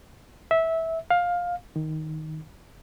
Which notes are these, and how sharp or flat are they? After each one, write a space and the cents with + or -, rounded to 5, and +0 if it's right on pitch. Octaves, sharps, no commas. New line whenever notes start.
E5 -15
F5 +15
D#3 +5